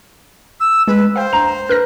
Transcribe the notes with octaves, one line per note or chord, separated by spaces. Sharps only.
E6
G#3 B4
C5 F5 G5
A#5 F7
B4 F6 F#6 A#6